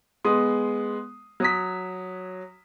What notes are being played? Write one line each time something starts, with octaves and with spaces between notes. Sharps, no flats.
G#3 B3 C6 D#6
F#3 D#6 B6